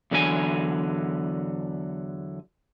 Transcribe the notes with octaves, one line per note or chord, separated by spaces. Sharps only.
E2 D3 F#3 E4 G#5